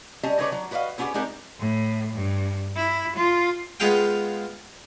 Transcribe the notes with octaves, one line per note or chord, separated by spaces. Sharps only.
G3 C#4 D#5 A5
C#3 G3 D#4 B4 C#5 D5
F#3
F#4 B4 D5 D#5 F5
B3 C#4 E4 F4 G4 G#4
G#3 C4 D4 D#4 G4 A#4
A2
G2
E4
F4
G#3 B3 F4 G#4 F5 G5